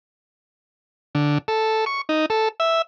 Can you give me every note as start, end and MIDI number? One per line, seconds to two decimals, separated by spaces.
1.15 1.38 50
1.48 1.85 69
1.86 2.01 85
2.09 2.26 63
2.30 2.49 69
2.60 2.82 76